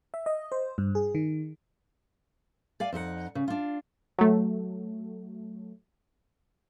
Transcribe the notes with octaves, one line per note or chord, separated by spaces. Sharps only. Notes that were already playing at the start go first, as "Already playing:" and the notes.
E5
D#5
C5
G2
G#4
D#3
D5 F5 G#5
F2 D#4 G4 F#5
C#3
D4 F4
F#3 A3